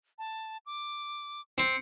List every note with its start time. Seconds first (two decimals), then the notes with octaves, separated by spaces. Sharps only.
0.18 A5
0.66 D6
1.58 C4 C#7